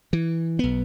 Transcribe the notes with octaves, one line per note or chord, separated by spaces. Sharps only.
E3
B1 B3